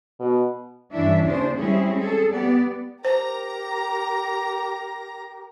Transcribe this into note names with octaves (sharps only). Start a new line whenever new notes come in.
B2
G2 E3 C#4 D4 E4 E5
D#2 C#3 D4 C5
G3 G#3 C4 C#4 E4 G#4
G#4 A4
B3 G4 D5
G4 A#4 C5 A#5